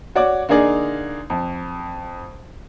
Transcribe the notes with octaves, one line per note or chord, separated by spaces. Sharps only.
F#4 C#5 D5 D6
D3 A#3 D#4 G#4 D5
F2